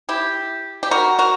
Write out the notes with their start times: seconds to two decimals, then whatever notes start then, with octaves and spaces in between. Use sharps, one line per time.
0.09 E4 G4
0.83 G4
0.91 F#4 A#4
1.19 F#4 A#4